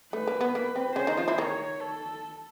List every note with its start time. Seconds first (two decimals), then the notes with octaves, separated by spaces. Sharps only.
0.13 A3 B4
0.27 A#3
0.41 B3
0.55 A#3
0.76 C4
0.96 C#3 C#4 C5
1.07 D#3 D#4
1.17 F3 F4
1.28 E3 E4
1.38 D#3 D#4 C#5
1.81 A4